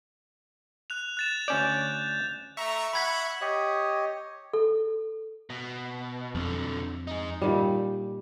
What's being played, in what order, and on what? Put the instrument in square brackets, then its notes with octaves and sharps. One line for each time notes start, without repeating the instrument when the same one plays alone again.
[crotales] F#6 F7
F#6 A6 E7
[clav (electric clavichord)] D2 C#4 D5 [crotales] G6
[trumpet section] A3 A#5 [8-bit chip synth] E5 C#6
[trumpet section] F#5 [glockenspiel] B5 G#6 B6
[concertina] G4 C#5 D#5
[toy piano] A4
[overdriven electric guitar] B2
[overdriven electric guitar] B1 D3 [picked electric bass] F2
[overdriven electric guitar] D#4 G#4
[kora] A#2 D#3 G3